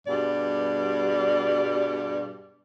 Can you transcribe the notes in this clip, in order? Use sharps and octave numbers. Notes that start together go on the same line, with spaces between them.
G2 B2 G3 G#4 D5